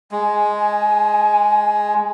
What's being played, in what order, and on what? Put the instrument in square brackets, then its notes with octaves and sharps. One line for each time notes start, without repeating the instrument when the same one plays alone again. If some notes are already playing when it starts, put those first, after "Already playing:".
[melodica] G#3 [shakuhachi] G#5